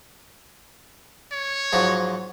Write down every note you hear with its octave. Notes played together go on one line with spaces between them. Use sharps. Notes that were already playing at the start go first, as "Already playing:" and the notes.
C#5
G#2 F3 F#3